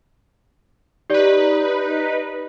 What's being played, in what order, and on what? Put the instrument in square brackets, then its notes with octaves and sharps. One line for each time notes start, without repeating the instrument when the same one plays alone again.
[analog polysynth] D#4 B4 [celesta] G4 D5